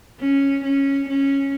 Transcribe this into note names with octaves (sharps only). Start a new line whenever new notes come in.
C#4
C#4
C#4